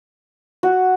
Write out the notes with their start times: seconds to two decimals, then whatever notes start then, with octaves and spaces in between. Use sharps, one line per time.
0.63 F#4